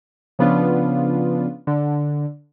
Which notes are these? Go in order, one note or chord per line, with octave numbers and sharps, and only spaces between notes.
C#3 F3 B3 D4 F4
D3